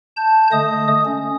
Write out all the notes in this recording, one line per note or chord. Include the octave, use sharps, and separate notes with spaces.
A5 G6
D3 A3 D#5 D#6
C#4